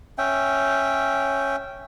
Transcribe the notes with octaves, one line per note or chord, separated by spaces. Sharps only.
C#4 E5 G5